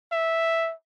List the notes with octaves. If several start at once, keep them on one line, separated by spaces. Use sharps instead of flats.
E5